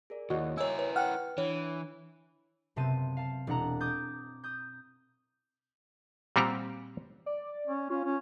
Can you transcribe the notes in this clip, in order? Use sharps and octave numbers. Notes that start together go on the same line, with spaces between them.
G#4 A#4 D5
D#2 E4 F#4 C#5 D#5
E4 A#4 C#5 G#5 E6
B4 C#5
F#5 G5 F6
E3 D4 C#5
F#1 C3 B3 C4 A5 D#7
F5 A5
E1 D4 F#5 A#5
D6 D#6 G6 A6
D#6 G6
A#2 G3 C4 F#4 G4 A#5
D5
C#4
C#4 F4
C#4